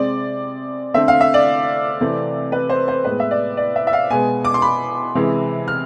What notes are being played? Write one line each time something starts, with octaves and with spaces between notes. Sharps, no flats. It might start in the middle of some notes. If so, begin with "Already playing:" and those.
Already playing: C3 G#3 C4 D5
D3 A3 C4 E5
F5
E5
D5
C3 E3 A3 C4
B4
C5
C5
A2 G#3 B3 B4
E5
D5
D5
E5
E5
F5
B2 G#3 B3 G#5
D6
C6
B5
C3 E3 G#3
F6